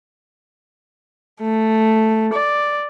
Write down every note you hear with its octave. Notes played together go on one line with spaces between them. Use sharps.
A3
D5